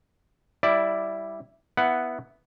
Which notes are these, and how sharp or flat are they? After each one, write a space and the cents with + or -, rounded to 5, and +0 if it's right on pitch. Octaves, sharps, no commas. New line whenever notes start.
G3 +0 E4 +0 D5 +0
B3 +0 E4 +0 F#5 +0